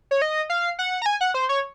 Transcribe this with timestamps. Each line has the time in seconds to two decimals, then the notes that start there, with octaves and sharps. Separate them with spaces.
0.11 C#5
0.22 D#5
0.50 F5
0.79 F#5
1.02 A#5
1.06 G#5
1.21 F#5
1.34 C5
1.49 C#5